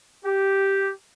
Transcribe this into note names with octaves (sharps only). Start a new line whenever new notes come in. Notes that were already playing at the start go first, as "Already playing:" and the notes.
G4